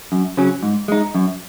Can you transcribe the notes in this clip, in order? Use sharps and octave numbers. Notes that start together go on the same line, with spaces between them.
F#2
C#3 F#3 C#4
G#2
G#3 D#4
F#2